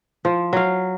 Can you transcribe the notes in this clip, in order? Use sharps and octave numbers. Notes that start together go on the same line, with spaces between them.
F3
F#3 F5